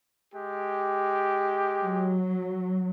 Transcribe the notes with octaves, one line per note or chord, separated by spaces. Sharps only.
G#3 G4
F#3